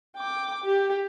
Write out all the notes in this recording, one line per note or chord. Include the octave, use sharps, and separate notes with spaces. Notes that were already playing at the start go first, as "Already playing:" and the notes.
G5 D6
G4